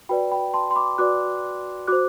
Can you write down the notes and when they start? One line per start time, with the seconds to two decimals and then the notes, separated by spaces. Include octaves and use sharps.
0.09 F#4 B4 D5 G5 B5
0.32 G5 B5
0.54 A5 C6
0.71 C6
0.76 B5 D6
0.98 F#4 B4 D5 D6 F#6
1.88 F#4 C5 D6 F#6